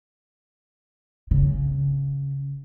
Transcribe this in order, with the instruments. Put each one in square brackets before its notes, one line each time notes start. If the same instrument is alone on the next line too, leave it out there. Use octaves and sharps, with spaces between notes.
[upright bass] C#3